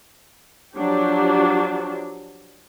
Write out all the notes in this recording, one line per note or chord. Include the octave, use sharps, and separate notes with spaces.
F3 F#3 D4 G4